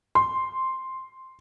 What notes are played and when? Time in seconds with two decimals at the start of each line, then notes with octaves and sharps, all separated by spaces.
0.15 C6